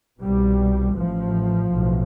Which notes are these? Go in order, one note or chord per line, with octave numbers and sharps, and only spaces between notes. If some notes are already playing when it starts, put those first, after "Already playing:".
C2 B2 G3
A1 A2 F3
B1 A2